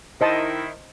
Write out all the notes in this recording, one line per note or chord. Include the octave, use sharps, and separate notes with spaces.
D#3 E4 C5 D#5 A5